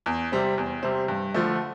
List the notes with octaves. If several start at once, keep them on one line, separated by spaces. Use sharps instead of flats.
E2
C3 G3 C4
E2
C3 G3 C4
G2
D3 F3 A3